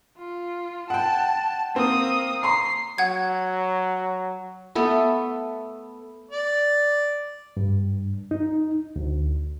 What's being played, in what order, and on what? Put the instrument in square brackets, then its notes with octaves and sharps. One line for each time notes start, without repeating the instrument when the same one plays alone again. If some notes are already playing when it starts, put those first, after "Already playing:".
[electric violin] F4
[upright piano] F#5 G5 [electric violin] A5
[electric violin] A#3 D#6 [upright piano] C4
[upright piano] A#5 C6 C#6 [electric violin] C7
[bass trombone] F#3 [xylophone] F#5 G#6
[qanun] A3 B3 A4
[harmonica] D5
[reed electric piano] G2
D#4
D2